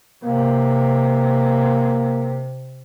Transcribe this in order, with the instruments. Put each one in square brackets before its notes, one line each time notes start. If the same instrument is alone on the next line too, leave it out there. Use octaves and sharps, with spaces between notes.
[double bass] C3 [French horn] A#3